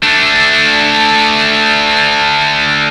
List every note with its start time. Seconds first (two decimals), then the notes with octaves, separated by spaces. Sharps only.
0.03 A3 D4